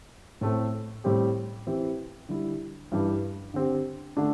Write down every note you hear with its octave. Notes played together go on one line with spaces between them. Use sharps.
A2 A3 C4
A2 G3 C4 G4
E3 C4 E4 G4
D3 G3 E4
G2 E3 G3 D4
D3 C4 G4
D3 A3 D4